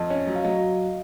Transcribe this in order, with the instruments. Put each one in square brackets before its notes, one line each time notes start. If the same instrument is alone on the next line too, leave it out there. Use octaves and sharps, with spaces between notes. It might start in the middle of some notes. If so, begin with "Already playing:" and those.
Already playing: [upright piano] F2 [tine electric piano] D#5
[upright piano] C#4
F#3
[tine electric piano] F5
[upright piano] F#3 [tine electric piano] D#5